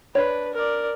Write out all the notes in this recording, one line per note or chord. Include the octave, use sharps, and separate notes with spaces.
D4 B4 C#5
A#4 D5